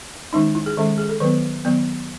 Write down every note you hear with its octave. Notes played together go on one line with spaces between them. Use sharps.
D#3 G#3 C#4 D#4
E4
G#4
D#3 G#3 C#4 A4
G#4
A4
D#3 F#3 B3 B4
D#3 F#3 B3